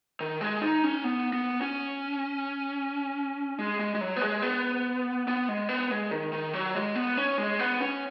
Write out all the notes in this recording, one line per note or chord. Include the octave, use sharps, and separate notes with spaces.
D#3
G#3
D#4
C#4
B3
B3
C#4
G#3
G#3
G#3
F#3
B3
G#3
B3
B3
G#3
B3
G#3
D#3
D#3
F#3
G#3
B3
C#4
G#3
B3
C#4